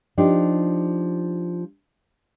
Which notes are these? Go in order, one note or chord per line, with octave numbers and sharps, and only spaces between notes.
F3 D4 D#4 G4